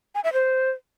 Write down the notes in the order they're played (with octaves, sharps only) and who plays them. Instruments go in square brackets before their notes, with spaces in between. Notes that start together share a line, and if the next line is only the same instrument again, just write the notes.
[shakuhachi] G#5
E5
C5